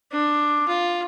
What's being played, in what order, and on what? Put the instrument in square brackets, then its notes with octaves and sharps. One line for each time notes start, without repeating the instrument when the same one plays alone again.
[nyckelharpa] D4
F4